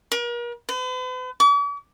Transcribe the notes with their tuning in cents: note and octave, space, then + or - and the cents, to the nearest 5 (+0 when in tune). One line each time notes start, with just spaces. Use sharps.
A#4 +40
B4 +45
D6 -45